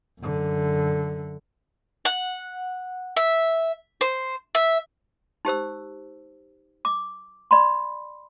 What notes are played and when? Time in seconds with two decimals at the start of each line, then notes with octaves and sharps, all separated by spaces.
0.21 F#2 D3
2.05 F#5
3.16 E5
4.01 C5
4.55 E5
5.45 D#4 G4 C5 E6
6.85 D6
7.51 D5 B5 C6